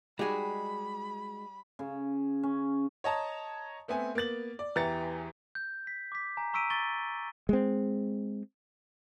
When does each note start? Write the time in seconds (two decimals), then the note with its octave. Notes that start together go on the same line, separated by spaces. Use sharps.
0.19 G3 G#3 D#4 F#4 G#4 B5
1.79 C#3
2.43 C#4
3.04 C#5 D#5 A5 A#5
3.88 A3 B3 C4 G#5
4.15 A#3 B3 A6 F#7
4.59 D5
4.76 E2 E3 G4 A#5 A6 C#7
5.55 G6
5.87 B6
6.12 D6 B6
6.37 G#5 A#5
6.53 A#5 C#6 E6 B6 D7 D#7
6.70 C#6 A6 G7
7.49 G#3 C4